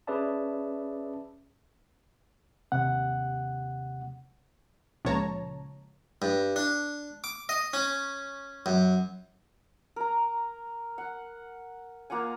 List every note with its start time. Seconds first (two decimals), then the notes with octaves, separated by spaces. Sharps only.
0.07 C#4 G#4 B4 D5 E5 A5
2.72 D#2 C3 F#5
5.05 C#2 A#2 F3 C#5 A5 A#5
6.22 G2
6.56 D4
7.24 D6
7.49 D#5
7.73 C#4
8.66 F#2
9.96 A#4 A#5
10.98 F#5
12.10 A#3 F4 F#5 G#5